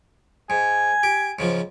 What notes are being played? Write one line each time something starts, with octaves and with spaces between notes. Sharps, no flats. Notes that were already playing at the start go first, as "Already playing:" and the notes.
G#2 G#5
G4
G#2 C#3 F3